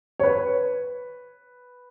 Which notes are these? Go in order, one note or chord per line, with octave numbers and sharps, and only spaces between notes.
C#5
B4